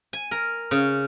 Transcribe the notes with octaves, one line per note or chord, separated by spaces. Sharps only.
G#5
A#4
C#3